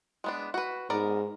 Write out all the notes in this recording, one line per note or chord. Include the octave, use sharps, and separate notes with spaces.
G#3 B3 D4
F#4 B4
G#2 B3 A#4 D5